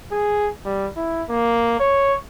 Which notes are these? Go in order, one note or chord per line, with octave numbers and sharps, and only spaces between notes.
G#4
G3
E4
A#3
C#5